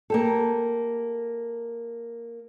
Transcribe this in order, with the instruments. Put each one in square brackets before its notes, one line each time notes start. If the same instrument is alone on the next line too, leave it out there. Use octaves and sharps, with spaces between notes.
[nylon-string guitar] A#3 G4 A4